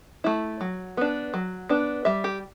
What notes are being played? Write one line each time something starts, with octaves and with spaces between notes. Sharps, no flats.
A3 E4
F#3
B3 D4
F#3
B3 D4
G3 E5
G4